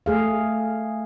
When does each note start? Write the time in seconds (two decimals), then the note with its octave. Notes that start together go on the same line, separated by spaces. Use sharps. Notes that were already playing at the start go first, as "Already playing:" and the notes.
0.06 A3 G#4 F5